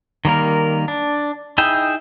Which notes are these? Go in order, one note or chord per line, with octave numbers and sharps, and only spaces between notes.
D#3 G3 A#3 A#4
D4
D#4 E4 G#4 E5 G5